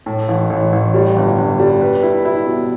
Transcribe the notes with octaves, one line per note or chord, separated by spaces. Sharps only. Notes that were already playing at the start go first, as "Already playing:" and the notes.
A2
A1
A1
A1
G3
G1
G1
G3
B4
E4
E4
B2